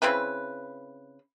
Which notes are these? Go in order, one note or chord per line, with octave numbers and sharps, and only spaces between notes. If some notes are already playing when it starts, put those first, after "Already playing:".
C#3 C4 E4 B4